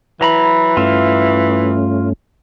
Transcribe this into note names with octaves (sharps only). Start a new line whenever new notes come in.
E3 F#3 A#5 B5
G2 A3 C#4 F4 E5 F5